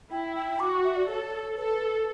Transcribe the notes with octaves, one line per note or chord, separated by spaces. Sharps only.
E4 G5
G5
F#4 D6
C#6
E5
D5
A4 C#5
A4 B4